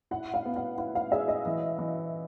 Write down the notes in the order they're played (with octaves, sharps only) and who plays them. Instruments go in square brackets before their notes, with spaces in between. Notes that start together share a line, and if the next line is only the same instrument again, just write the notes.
[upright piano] E4 [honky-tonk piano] F#5
[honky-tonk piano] F5
[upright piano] B3
[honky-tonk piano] F#5
[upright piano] E4 [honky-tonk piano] F#5
[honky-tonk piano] F5
[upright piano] G#4 [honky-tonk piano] E5
[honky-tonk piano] D#5
[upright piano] E3
E3